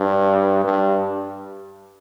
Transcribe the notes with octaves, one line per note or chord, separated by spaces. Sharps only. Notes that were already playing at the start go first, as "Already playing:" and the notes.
Already playing: G2
G2